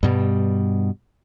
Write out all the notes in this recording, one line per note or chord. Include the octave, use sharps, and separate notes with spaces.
G2 B2 G3